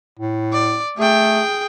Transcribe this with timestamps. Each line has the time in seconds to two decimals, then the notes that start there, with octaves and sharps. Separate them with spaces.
0.19 A2
0.53 D5
0.98 A3 G#4 G5